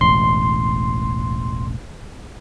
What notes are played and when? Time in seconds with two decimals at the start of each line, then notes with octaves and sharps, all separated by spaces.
0.01 E1 A1 C6